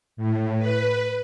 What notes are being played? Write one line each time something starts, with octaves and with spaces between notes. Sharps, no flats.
A2
B4